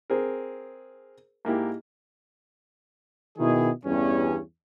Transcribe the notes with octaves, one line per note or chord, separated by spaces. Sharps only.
C4 G#4 A#4
G#2 A#3 E4 G4
B2 D#3 E4 G#4
E2 G2 C#4